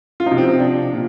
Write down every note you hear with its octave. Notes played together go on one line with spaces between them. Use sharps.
F4
F3 D#4
C3
C4
C4
D4
A#2